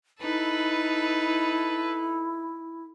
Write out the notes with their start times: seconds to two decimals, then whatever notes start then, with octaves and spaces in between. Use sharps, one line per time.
0.20 D#4 E4 A4 B4